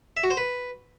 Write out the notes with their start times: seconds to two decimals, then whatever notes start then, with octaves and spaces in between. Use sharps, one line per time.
0.17 E5
0.24 F#4
0.30 C5
0.37 B4